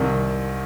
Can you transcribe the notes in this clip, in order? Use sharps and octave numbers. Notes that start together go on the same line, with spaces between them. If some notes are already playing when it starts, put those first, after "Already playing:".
Already playing: C2 C3 D#3